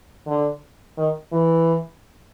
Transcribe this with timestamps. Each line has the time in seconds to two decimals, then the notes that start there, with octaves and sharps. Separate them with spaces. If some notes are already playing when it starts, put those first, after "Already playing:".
0.27 D3
0.97 D#3
1.32 E3